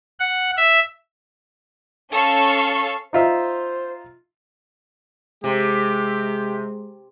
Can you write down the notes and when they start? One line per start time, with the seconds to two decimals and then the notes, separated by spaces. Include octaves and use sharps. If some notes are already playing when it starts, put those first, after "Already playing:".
0.20 F#5
0.57 E5
2.11 C#4 A4 F5 C#6
3.13 D#4 F4 C5 E5
5.44 C3 G#3 G4